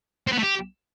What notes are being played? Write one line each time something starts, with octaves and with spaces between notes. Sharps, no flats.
C4
B3
A3
G4